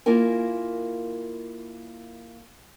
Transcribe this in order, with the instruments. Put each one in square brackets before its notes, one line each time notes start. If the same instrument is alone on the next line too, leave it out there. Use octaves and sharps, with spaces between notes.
[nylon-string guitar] A#3 E4 F4 A#4 G#5